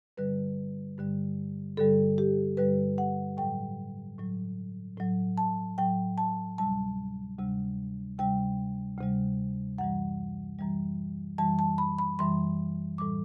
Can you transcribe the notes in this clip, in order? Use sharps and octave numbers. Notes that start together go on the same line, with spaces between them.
G2 D3 G3 B4
G2 D3 G3
G2 D3 G3 A4
G4
G2 D3 G3 B4
F#5
A2 F#3 G5
A2 F#3
A2 F#3
A5
A2 F#3 G5
A5
D2 C3 G3 A5
D2 C3 G3
D2 C3 G3 G5
D2 C3 G3
F#2 E3 G3 F#5
F#2 E3 G3
F#2 E3 G3 A5
A5
B5
B5
F#2 E3 G3 C6
A2 E3 G3 D6